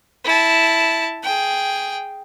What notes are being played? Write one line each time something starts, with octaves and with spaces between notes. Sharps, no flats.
E4 A5
G#4 G5